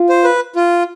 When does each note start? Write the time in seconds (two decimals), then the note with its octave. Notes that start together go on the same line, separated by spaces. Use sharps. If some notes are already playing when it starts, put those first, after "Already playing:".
Already playing: F4
0.09 C5
0.24 B4
0.56 F4